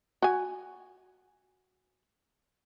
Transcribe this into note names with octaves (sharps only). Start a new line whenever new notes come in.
F#4 G#5